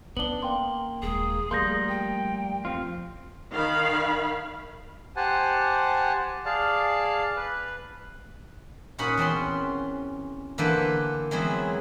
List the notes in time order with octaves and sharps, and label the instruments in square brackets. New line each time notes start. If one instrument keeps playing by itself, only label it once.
[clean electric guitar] B3 D4 [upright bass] C#4 [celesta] F#7 G7
[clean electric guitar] A#3 [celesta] G5 C6
[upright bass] D#1 G#3 [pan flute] G#4
[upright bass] F3 A3 [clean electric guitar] G3 A#3 [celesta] C6 G6 A#6
[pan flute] G5
[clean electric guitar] F2 C4 F4
[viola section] D#3 F5 B5
[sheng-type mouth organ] G4 C5 F#5 G#5 A5
G#4 D5 F5 A5
B4
[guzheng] A#2 C#4 D#4 F#4 F#5 B5
E2 C4 C#4 C6
D3 E3 A#3 A4 B4 C5
E3 F#3 G#3 B3 C4 E4